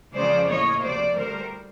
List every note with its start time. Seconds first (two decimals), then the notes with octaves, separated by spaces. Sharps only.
0.14 F2 C#3 F3 G#3 C5 D5
0.48 A2 F3 A#3 C#5 D#5
0.81 D2 C3 F3 C5 D5
1.15 D2 D3 G3 A#4 C5